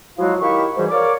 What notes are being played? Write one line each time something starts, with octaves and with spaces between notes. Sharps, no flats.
F3 F#3 G#3 E4 F#4 F5
D#3 E4 G4 F5 C#6
G#2 E3 G3 F#4 G#4 C5
A#4 C#5 D5 F5 D6